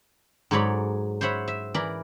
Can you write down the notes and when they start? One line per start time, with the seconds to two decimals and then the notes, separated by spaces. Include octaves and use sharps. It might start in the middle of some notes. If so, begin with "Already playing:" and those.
0.51 G#2 F#3 A4 C#5 D5 B5
1.21 C5 C#5 E5 F#5 B5
1.48 E5
1.74 E3 A#4 D5 B5